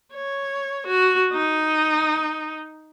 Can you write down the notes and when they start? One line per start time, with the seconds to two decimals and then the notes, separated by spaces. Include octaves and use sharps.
0.13 C#5
0.87 F#4
1.33 D#4